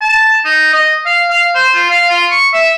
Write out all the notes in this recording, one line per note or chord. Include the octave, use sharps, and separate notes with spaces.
A5
D#4
D#5
F5
F5
C5
F4
F5
F4
C#6
E5